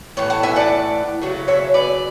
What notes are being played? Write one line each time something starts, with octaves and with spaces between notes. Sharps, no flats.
A2 E3 C#5
F#5 A5
E5 G#5
D5 F#5
C#3 F#3 A3
C#5 E5
B4 D5